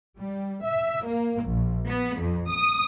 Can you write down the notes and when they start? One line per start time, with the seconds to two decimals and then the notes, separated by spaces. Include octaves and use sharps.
0.18 G3
0.64 E5
1.07 A#3
1.44 A#1
1.87 B3
2.20 F2
2.51 D#6